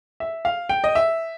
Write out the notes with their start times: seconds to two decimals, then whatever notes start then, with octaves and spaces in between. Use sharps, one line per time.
0.20 E5
0.45 F5
0.69 G5
0.84 D#5
0.95 E5